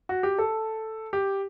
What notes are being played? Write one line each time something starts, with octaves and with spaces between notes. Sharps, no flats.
F#4
G4
A4
G4